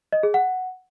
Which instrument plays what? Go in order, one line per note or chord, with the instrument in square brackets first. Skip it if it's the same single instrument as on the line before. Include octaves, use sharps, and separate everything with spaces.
[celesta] D#5
G#4
F#5